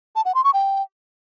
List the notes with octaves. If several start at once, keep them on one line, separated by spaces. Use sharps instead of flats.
A5
F#5
C6
C#6
G5